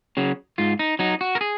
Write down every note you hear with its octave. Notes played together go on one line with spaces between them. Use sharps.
C#3 F#3
G#2 F4
D#4
F#3 D#4
F#4
A#4
G#4